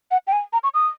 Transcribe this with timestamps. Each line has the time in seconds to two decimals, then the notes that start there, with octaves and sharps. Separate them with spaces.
0.11 F#5
0.27 G5
0.32 G#5
0.53 A#5
0.64 C#6
0.74 D#6